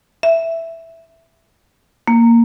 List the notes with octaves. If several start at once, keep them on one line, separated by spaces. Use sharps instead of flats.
E5
A#3